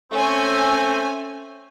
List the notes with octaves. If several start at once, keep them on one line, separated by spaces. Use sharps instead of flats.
A3 C4 C#4 G#5